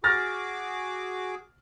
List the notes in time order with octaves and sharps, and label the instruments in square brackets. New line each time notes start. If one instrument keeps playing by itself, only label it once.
[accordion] F#4 G#4 D6 [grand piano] F6 A6 A#6